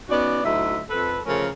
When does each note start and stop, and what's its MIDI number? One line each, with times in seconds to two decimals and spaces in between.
0.09 0.43 59
0.09 0.43 61
0.09 0.43 63
0.09 0.43 66
0.09 0.43 74
0.43 0.78 38
0.43 0.78 54
0.43 0.78 63
0.43 0.78 64
0.43 0.78 75
0.43 0.78 76
0.89 1.19 41
0.89 1.19 69
0.89 1.19 71
1.26 1.47 49
1.26 1.47 53
1.26 1.47 57
1.26 1.47 61
1.26 1.47 70